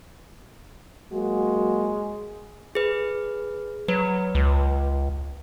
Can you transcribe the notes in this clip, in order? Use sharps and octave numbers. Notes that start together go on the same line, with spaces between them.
F#3 G#3 A#3 F#4
G#4 B4
F#3 B4
C#2